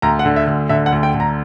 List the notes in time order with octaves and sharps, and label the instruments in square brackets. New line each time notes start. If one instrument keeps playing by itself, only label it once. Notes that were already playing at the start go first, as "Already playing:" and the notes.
[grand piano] D2 A#5
F#5
D3
E5
D2
D3 E5
F#5
D2
G5
D3
A#5